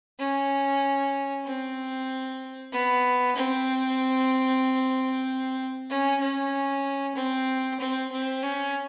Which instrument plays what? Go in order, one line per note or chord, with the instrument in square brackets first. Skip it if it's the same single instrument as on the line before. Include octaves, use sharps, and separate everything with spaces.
[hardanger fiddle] C#4
C4
B3
C4
C#4
C#4
C4
C4
C4
C#4